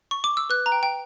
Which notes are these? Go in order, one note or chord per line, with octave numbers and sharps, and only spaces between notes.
C#6
D6
E6
B4 F#6
A#5
G5
G5